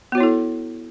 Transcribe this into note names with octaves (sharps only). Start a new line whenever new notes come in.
B3 E4 F#4 A4 C#5